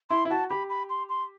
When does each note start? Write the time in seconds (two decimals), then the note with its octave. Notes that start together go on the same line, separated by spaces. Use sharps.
0.10 E4 C6
0.25 E4
0.30 F#4 A5
0.50 G4 B5
0.69 B5
0.89 C6
1.09 C6